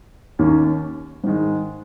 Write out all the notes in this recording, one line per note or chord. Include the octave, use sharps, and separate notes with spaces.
D#2 D#3 A#3 C#4
G#2 D#3 G#3